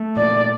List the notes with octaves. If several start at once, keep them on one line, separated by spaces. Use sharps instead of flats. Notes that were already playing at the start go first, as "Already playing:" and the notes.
Already playing: A3
A#2 D5